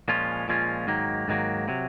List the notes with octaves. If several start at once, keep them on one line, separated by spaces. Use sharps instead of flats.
A#2 F3 G#3 C#4 F4
A#2 F3 G#3 C#4 F4
G#2 D#3 F#3 A#3
G#2 D#3 F#3 A#3
C3 F#3